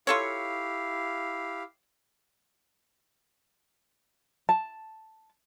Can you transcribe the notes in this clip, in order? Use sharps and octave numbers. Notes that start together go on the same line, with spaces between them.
E4 F4 G4 A4 C#5 F5
A5